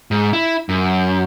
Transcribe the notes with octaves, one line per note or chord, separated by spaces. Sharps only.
G#2
E4
F#2